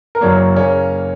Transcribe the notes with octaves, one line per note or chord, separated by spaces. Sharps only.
A#4
F#1 F#2 F#3 A#3 C#5
C#3 A#3 C#4